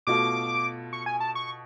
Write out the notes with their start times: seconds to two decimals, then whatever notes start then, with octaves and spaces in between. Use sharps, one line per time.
0.07 B2 A3 F4 D6
0.93 C#6
1.06 G#5
1.20 A5
1.35 C#6